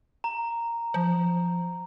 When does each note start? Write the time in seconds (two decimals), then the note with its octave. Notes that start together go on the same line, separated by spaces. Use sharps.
0.24 A#5
0.94 F3